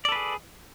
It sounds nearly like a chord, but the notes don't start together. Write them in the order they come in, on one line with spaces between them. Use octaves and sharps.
D5 A4 B4 G#4